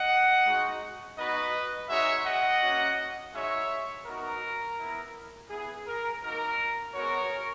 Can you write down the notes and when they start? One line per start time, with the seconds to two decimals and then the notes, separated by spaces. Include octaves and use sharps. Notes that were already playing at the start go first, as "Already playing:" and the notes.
Already playing: D#5 F#5
0.45 G#3 D#4 F#4
1.17 B3 D#4 F#4 B4 D#5
1.89 G#3 D#4 F#4 C#5 E5
2.25 D#5 F#5
2.62 A#3 C#4 F#4
3.34 G#3 D#4 F#4 C#5 E5
4.06 B3 D#4 F#4 A#4
4.78 B3 E4
5.50 B3 E4 G#4
5.87 A#4
6.22 A#3 D#4 F#4 A#4
6.95 G#3 B3 F#4 A#4 C#5